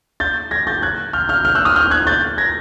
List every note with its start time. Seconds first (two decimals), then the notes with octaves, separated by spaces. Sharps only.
0.20 G6 A6
0.51 G#6 A#6
0.67 G6 A6
0.83 F#6 G#6
1.13 F6 G6
1.29 F6 G6
1.45 F6 G6
1.55 E6 F#6
1.65 D#6 F6
1.76 F6 G6
1.91 F#6 G#6
2.07 G6 A6
2.38 G#6 A#6